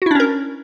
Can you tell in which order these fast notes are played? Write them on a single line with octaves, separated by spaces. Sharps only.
F#4 E4 D4 C#4 A#4